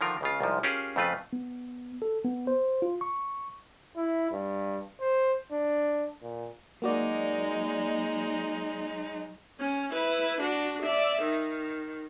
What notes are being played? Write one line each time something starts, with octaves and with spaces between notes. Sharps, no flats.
D3 D#3 F3 F4 A#4
C#2 C#3 F4
C2 G#2 F3
C#4 F4 G4 G#4 A#4
F2 C#3 A3 F4 B4
B3
A4
B3
C5
F4
C#6
E4
G2
C5
D4
A#2
F#3 G#3 A#3 D#4 F#4 D5
C#4
E4 B4
D4 F#4
D5 E5
D#3